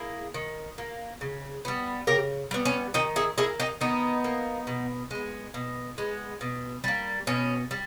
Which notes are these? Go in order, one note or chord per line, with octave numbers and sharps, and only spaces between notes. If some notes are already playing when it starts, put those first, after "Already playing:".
Already playing: A#3 E4 G#4
D#3
A#3
C#3
G3 B3
C#3 G4 A#4
G3 B3
C#4
D#3 D#4 G4
E4 G#4
A#3 E4 G#4
D#4 G4
D#3 B3 D#4
A#3
B2
G#3 B3
B2
G#3 B3
B2
G3 A#3
B2 C#4
G3